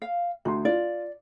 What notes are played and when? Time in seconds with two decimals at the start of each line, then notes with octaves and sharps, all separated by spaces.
0.02 F5
0.45 D2 D#4 C6
0.65 F4 D5